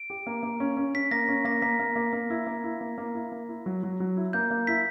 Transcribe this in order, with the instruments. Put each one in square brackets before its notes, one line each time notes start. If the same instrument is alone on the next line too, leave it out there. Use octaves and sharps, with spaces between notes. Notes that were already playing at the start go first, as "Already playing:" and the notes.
Already playing: [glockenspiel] D7
[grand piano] G4
A#3
A#3
C#4
C#4
[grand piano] C#4 [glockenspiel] B6
[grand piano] A#3 [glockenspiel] A#6
[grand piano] C#4
[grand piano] A#3 [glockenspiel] A#6
[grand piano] A#3 [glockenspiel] B6
[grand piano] A#3
A#3
A#3
E4
A#3
E4
A#3
A#3
E4
A#3
E4
F#3
F#3
F#3
E4
[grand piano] A#3 [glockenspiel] G6
[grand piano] A#3
[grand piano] E4 [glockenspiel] B6